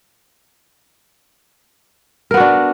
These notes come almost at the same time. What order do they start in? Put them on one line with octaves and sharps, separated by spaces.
A#4 B3 F#4 D4